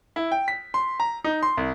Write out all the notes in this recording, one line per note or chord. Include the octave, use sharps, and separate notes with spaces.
E4
G5
B6
C6
A#5
D#4
C6
C2